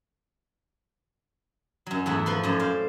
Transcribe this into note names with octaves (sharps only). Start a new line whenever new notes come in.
F#2 F#3
E2 G#2 A3 F#5
F3 B4 C6
F#2 A2 C5 D5
C5 D5 F5